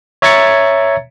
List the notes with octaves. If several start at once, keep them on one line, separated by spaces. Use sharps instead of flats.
C#5 E5 A#5 G#6 A6 C#7